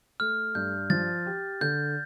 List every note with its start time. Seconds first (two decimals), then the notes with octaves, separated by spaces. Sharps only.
0.20 A3 F6
0.55 G2 G6
0.90 F3 A6
1.26 G4
1.61 D3 G6